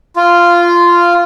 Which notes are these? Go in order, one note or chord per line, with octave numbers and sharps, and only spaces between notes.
F4